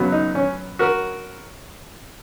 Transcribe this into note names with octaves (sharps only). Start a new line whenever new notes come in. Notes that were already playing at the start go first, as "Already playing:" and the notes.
Already playing: F#2 C#3 F#3 B3
D#4
C#4
F#4 A#4